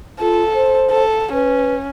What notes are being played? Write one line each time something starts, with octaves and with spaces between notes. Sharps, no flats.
F4 A4
C5
A4
C#4 B4